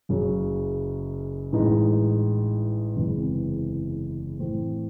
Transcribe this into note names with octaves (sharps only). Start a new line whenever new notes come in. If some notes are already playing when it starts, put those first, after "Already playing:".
F#1 F#2 C#3 F#3
A1 A2 E3 G#3 D#4
F#1 E2 C3 E3 G#3
A2 E3 A3 C4